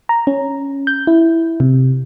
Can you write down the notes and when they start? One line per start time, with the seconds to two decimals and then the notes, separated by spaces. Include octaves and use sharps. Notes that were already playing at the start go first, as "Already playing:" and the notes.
0.09 A#5
0.27 C#4
0.87 G6
1.07 E4
1.60 C3